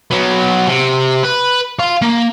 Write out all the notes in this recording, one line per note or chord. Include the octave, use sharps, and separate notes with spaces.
F#3 B3
C3
B4
F5 C6
A#3